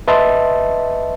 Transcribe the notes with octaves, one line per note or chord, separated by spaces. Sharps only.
B4 D#5 E5 A5 C6